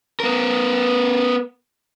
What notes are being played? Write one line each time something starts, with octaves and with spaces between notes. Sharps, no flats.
B3 A#4